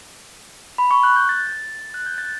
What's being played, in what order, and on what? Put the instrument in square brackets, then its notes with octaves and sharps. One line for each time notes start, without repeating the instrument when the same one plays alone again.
[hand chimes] B5
C#6
F#6
G6
A6
F#6
G6
A6